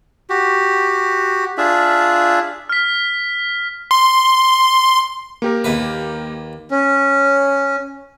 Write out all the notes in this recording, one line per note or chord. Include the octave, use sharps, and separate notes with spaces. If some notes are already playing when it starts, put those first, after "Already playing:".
F#4 G4
D4 F4 G#4 E5
F6 B6
C6
A#3 G4 A#4
D#2 B4
C#4